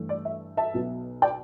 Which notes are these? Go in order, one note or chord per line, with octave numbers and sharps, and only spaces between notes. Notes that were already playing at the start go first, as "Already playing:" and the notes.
Already playing: G2 E3 A3
D5
E5
E5 A5
B1 B2 B3
D5 G5